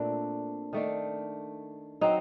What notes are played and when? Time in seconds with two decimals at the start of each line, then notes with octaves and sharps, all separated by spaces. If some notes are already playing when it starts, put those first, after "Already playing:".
Already playing: A#2 A3 C4 D4
0.73 D#3 A3 D4
2.01 F#3 C4 D#4